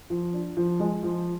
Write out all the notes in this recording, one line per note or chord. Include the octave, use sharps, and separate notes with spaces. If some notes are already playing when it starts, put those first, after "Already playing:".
F3
D4
F3
G#3
F3